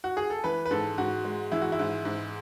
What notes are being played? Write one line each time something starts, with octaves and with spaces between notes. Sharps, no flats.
F#4
G#4
A4
E3 B4
B4
G#2 A4
G#2 F#4
G#3
E3 E4
F#4
E4
G#2
G#2